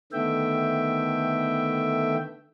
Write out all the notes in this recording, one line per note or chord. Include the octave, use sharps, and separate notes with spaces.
D3 D#3 A3 B3 E5 G5